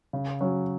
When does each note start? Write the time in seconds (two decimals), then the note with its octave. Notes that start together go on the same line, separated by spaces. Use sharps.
0.13 C#3
0.41 F#3 C#4